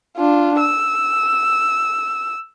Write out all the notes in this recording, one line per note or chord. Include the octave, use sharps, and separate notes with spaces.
D4 F4
E6